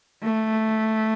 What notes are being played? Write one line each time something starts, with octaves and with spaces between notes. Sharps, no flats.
A3